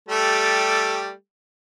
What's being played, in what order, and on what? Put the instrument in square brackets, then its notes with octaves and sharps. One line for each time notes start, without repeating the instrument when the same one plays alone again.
[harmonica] G3 A3 G4